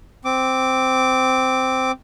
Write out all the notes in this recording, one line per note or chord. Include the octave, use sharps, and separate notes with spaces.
C4 D6